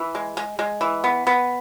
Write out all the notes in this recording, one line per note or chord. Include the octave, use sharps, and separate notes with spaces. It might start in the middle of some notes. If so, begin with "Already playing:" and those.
Already playing: E3
G#3
G#3
G#3
E3
B3
B3